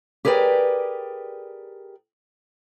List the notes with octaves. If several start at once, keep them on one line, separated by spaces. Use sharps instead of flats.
G4 G#4 A#4 B4 D5 G5